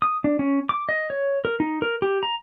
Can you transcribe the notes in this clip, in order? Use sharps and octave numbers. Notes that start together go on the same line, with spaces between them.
D#6
D4
C#4
D6
D#5
C#5
A#4
D#4
A#4
G4
A#5